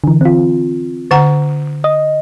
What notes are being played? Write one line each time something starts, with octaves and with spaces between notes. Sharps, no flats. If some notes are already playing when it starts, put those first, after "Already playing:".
D3 E3
C4 F4
D3 F#5 A#5
D#5